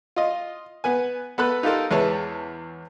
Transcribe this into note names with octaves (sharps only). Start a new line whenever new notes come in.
F4 D#5
B3 B4 G#5
B3 A4 B4 B5 F#6
D#4 F4 G4 A4 A#4
E2 G#3 B4 C#5 E5 A5